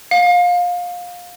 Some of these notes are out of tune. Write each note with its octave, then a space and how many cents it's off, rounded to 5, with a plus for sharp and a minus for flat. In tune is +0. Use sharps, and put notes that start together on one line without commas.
F5 +25